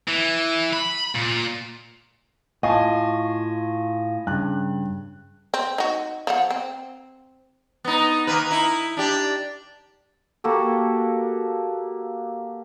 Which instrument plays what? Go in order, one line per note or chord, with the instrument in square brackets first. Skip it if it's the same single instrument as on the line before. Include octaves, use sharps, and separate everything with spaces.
[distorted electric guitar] E3
B5
A#2
[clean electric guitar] A2 F4 [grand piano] D#5 G#5 A5
[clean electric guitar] G2 [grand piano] C#3 F#6
[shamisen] C4
D#4 F#4
F3 F#5
C4
[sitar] B3 D#4
D#3 A#3 B4
D#4 E4
D4 G4
[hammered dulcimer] A#3 F#4 G4 A4